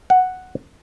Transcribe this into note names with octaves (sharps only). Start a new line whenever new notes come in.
F#5